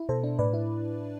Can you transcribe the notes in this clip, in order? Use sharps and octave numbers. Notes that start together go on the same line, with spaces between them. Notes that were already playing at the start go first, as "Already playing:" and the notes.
Already playing: E4
B2 A4 C5
D4
A2 B4 D5
E4